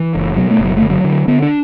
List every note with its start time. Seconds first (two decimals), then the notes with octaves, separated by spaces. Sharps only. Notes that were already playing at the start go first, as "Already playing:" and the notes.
Already playing: E3
0.15 F#1
0.36 B2 F#3
0.50 A3
0.59 F#1
0.64 F#3
0.77 A3
0.82 D3
0.90 F#3
1.04 D3
1.27 D3 B3
1.42 D4